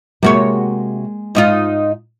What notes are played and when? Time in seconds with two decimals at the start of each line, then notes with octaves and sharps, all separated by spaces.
0.23 C3 G#3 A#3 F#4 A#4 C#5
1.35 G#2 D#4 F4